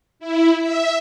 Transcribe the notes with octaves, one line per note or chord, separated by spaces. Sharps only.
E4
E5